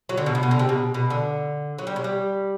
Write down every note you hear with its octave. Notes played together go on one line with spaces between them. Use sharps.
F#3
D3
B2
A2
B2
D3
C3
B2
B2
D3
F#3
G3
F#3
G3